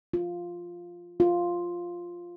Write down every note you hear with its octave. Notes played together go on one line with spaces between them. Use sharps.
F4
F4